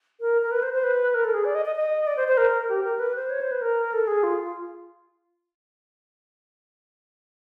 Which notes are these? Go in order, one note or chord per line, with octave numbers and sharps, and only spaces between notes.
A#4
A#4
B4
C5
C5
B4
A#4
A4
G#4
D5
D#5
D#5
D#5
D5
C5
C5
A#4
G4
A#4
B4
C5
C#5
C5
B4
A#4
A4
G#4
F4